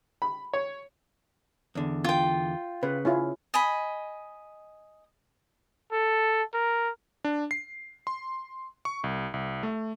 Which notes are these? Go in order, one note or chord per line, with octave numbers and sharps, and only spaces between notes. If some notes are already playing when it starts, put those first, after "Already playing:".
B5
C#5
E2 D3
F4 G5
C#3 B4
C#4 E4 F4
D#5 G#5 B5
A4
A#4
D4
C7
C6
C#6
C2
C2
A3